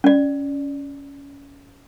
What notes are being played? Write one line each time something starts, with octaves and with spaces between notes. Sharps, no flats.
C#4 D5